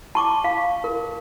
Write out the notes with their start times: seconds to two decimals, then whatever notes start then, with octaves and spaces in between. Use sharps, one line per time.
0.15 A5 C#6 D6
0.44 F5
0.84 A#4